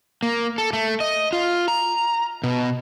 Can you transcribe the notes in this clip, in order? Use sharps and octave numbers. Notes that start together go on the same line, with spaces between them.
A#3
A4
A3
D#5
F4
A#5
B2